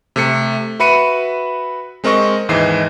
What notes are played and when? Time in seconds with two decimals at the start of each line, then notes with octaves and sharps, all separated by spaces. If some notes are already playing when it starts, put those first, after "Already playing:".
0.16 C3 A3 C#7
0.79 F#4 B4 E5 B5 C#7 D#7
2.04 G#3 C4 A#4 D#5 C#6 A#6
2.49 D#2 G#2 E3 D#5 C7